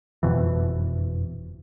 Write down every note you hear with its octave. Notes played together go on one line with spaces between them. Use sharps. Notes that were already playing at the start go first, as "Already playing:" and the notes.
F#1 F2 B2 E3